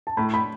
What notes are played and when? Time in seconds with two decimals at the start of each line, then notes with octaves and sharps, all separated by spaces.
0.07 A5
0.17 A2 B5
0.34 B5